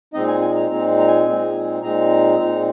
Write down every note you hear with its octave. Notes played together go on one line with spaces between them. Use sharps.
A#2 G#3 C4 D#4 D#5
G#5
G#5
A#5
A#2 G#3 C4 D#4 A#5
A#5
G#5
A#2 G#3 C4 D#4
A#2 G#3 C4 D#4 A#5
A#2 G#3 C4 D#4